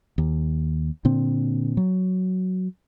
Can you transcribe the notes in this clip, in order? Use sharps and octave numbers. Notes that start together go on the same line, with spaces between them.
D#2
A#2 D3 C4
F#3